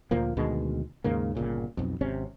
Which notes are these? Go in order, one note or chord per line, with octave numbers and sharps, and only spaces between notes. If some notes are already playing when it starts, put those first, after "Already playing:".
D2 A#2 F3 A#3
D2 B2 D#3 G#3
D#2 G#2 C#3 A#3
G1 C2 A#2 C#3
B1 F2
G#1 C3 C#4